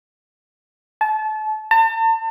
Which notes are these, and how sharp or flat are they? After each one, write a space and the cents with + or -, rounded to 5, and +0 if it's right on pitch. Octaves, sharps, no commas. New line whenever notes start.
A5 -30
A5 +40